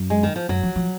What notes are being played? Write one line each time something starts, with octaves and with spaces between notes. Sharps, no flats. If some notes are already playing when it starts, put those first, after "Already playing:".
Already playing: F#2
G#3
D#3
F3
F#2 F#3
F3
F3